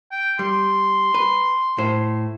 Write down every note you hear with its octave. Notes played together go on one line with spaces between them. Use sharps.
G5
G3 C6
B4
A2 C5